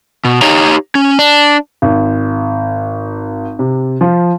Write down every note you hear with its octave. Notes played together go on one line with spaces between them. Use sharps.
B2
D#4 G4 C#5 F5 A#5
C#4
D4
G#1
C3
F3